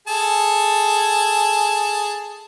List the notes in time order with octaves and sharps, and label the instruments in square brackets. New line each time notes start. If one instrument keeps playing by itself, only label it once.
[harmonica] G#4 A4 A5